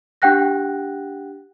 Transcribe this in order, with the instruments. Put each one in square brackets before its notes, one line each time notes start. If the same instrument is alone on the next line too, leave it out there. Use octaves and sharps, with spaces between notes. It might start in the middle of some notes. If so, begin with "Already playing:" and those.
[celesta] D4 G4 F#5 G5 F#6 A#6